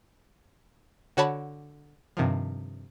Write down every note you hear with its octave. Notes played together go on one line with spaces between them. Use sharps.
D3 F#4 C#5 A5 B5
G2 C3 D#3 F3